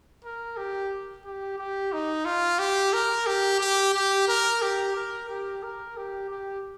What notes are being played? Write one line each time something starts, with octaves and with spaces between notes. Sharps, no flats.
A#4
G4
G4
G4
D#4
F4
G4
A#4
G4
G4
G4
A#4
G4
A#4
G4
A#4
G4
G4